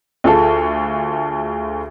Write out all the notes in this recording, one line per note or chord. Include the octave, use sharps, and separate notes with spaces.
D2 F4 G#4 A4